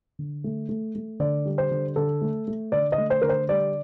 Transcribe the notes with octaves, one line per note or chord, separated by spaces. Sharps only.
D3
A3
A3
A3
D3 D5
G3
C5
D3
D3 A4
A3
A3
D3 D5
D#5
A3
C5
D3 A#4
C5
G3 D5